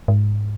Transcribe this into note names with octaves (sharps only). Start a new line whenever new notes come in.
G#2